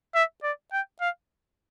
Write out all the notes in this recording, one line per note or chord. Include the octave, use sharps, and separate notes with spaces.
E5
D5
G5
F5